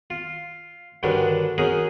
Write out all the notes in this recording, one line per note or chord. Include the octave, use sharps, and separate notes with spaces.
F4
G2 D3 D#3 C#4 D4 F#4
C#4 D#4 F#4 G#4 A#4